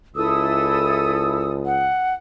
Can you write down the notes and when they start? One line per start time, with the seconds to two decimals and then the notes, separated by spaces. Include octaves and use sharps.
0.16 C#2 E4 A4 D#6 E6
1.66 F#5